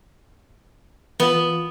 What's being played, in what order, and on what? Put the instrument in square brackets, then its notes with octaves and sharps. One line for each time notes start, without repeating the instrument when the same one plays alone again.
[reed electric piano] E3 F4 [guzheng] B3